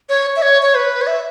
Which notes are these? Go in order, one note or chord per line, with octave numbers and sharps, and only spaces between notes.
C#5
E5
C#5
C#5
B4
C#5
E5